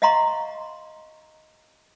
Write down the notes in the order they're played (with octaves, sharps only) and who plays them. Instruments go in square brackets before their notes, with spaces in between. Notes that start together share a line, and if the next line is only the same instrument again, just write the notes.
[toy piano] D#5 F5 F#5 A#5 C6 C#6